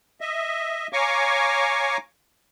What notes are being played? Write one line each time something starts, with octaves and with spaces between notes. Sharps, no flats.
D#5 E5
C#5 F5 G#5 A#5 C#6 D6